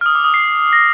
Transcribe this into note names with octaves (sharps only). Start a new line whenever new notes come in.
F6
D#6
D6
D#6
C7
A#6